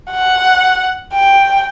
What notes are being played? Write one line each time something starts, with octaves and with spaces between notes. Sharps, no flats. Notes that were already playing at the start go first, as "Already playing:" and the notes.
F#5
G5